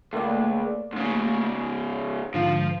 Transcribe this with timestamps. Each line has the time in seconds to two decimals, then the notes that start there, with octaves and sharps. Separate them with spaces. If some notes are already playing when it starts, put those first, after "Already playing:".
0.13 C#2 A3 A#3 D5
0.93 G#2 C#3
2.34 G#2 D3 F3 F4